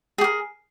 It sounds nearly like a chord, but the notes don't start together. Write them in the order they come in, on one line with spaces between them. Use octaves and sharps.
G#4 G4 A#4